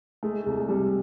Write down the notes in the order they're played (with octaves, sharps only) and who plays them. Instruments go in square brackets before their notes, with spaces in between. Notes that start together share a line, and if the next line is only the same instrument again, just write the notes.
[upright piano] G#3 [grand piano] A3
[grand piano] C2 [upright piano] G#3
[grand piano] C3 [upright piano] G3